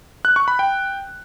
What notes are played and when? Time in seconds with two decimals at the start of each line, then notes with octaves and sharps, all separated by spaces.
0.25 F#6
0.36 C#6
0.48 B5
0.59 G5